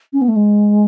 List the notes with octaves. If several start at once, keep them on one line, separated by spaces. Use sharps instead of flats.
C#4
B3
A3
G#3